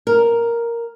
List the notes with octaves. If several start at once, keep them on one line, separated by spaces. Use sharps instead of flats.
A#4